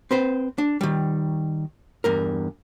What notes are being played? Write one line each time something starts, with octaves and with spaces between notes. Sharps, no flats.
C4 B4 C5
D4
D#3 G3
E2 G2 A#4